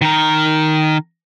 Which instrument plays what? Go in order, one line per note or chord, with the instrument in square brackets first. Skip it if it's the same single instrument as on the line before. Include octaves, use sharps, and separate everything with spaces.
[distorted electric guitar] D#3 A#4